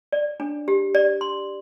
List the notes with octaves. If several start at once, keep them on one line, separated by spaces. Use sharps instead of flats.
D5
D4
G4
D5
C6